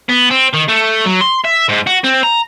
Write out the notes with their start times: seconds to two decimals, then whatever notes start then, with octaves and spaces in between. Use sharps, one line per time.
0.09 B3
0.31 C4
0.54 D#3
0.69 A3
1.05 F#3
1.21 C6
1.45 E5
1.69 G#2
1.87 F#4
2.04 C4
2.23 A#5